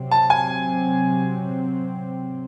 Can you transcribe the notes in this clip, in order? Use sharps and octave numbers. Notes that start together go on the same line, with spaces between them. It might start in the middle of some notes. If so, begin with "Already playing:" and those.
Already playing: C3 F#3 C4
A5
G#5